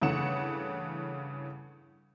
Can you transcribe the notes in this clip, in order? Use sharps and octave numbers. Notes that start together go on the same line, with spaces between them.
G2 C#3 E3 A3 F#5 E7